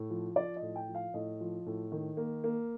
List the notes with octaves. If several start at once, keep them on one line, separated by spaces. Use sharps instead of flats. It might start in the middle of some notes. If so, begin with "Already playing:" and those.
Already playing: A2
F3
F3 D5
D#5
A2
G5
F3
F5
A2 D#5
F3
A2
D#3
A#3
A#3